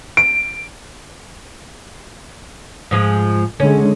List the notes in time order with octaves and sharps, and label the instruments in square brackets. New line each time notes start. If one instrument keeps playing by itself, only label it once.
[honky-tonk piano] D7
[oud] G#2 F3 G#3
[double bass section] D3 G#3 [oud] C#4